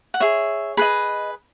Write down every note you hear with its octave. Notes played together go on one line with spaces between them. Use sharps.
F#5
G#4 C#5 E5
G#4 B4 D#5 B5